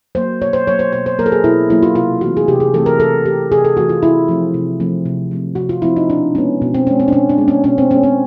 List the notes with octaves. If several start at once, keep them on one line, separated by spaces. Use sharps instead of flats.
F#3 A#3 C5
B2 C#5
C5
F#3 A#3 C#5
C5
B2 C5
C5
F#3 A#3 A#4
A4
G#4
B2 E4
F#3 A#3 E4
F4
C3 F4
E3 A3 C4 F#4
G#4
C3 G4
G#4
E3 A3 C4 A4
A#4
C3 A4
E3 A3 C4 G4
C3 G#4
A4
E3 A3 C4 F#4
F4
C3 E4
F3 A3 C4
C3
F3 A3 C4
C3
F3 A3 C4
C3 F#4
F4
F3 A3 C4 E4
D#4
B2 D4
G#3 B3 C#4
B2
C4
G#3 B3 C#4
C4
D4
B2 C#4
D4
G#3 B3
C#4
B2 C#4
C4
G#3 B3 C#4
C4